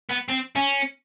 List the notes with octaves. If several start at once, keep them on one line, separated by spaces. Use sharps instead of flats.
B3
C4
C#4